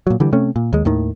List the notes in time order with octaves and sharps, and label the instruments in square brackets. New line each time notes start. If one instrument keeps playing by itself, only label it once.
[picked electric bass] A#2 F#3
D3 E3 G3
C3 A3 C#4
A#2
D#2 G#3
D#2 A2 D#3